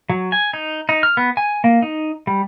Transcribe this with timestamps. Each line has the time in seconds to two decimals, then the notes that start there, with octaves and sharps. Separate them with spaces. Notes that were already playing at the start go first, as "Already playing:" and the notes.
0.10 F#3
0.32 G#5
0.54 D#4
0.89 D#4
1.03 F6
1.17 B3
1.37 G#5
1.64 A#3
1.82 D#4
2.27 G3